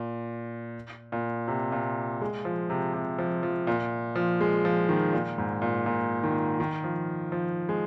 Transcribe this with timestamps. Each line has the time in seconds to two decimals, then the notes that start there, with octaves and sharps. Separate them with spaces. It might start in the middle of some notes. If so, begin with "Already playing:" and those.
Already playing: A#2
1.12 A#2
1.48 C3
1.72 A#2
2.21 G#3
2.45 F3
2.70 C3
2.94 C3
3.19 F3
3.43 F3
3.67 A#2
4.16 F3
4.41 G#3
4.65 F3
4.89 D#3
5.13 A#2
5.38 G#2
5.62 A#2
5.86 A#2
6.23 D#3
6.60 D#3
6.84 F3
7.32 F3
7.69 G#3